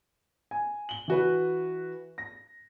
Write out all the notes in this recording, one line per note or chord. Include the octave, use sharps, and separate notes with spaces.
G#5
F#7 G7
E3 F#4 B4
A#6